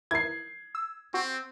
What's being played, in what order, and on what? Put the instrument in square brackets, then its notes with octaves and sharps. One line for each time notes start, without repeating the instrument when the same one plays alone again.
[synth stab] E3 E4 A#4 [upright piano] G#6 C7
[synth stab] E6
[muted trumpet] C4 [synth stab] F#4